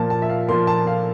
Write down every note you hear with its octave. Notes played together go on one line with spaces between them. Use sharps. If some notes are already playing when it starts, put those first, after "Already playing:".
Already playing: A#2 F3 A#3 A5
A5
E5
F5
A#2 F3 A#3 C6
A5
F5